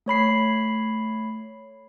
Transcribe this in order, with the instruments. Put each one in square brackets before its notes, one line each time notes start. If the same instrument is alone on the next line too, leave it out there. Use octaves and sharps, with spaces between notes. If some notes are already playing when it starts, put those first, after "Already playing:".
[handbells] A3 C#5 B5 C7